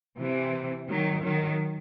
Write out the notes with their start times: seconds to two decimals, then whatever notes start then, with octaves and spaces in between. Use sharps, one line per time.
0.17 C3 E3
0.87 D#3 F#3
1.22 D#3 F#3